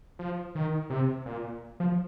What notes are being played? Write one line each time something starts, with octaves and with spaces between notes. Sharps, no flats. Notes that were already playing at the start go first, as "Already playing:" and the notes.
F3
D#3
C3
A#2
F3